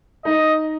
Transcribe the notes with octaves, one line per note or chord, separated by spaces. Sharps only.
D#4 D#5